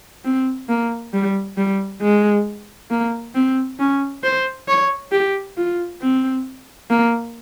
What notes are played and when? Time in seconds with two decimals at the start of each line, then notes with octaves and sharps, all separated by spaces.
0.25 C4
0.69 A#3
1.13 G3
1.57 G3
2.02 G#3
2.91 A#3
3.35 C4
3.79 C#4
4.24 C5
4.68 C#5
5.12 G4
5.57 F4
6.01 C4
6.90 A#3